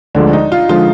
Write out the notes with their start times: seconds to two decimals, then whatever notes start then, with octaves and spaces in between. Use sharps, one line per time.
0.15 D2 D3 F3 G#3 D4
0.33 D#4
0.52 F4
0.69 D3 F3 G#3 F4